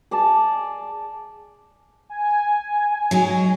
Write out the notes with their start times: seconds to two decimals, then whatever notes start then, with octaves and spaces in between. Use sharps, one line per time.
0.11 G#4 D5 D#5 A5
2.10 G#5
3.11 F#3 G#3 D#4